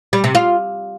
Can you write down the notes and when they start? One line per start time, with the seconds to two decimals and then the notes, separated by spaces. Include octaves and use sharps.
0.13 G3
0.24 C3
0.35 F4